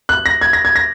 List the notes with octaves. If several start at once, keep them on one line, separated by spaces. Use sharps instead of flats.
F#6
A#6
G#6
A#6
G#6
A#6